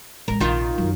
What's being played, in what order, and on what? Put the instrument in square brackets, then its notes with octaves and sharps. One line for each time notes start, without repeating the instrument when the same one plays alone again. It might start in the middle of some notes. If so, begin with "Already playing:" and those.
[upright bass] A1 G#3 [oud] A#4
[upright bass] A#1 C3 [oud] D#3 D#4 F4
[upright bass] F#2